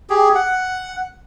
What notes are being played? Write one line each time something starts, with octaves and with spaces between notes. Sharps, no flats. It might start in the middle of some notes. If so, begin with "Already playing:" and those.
G4 G#4
F#5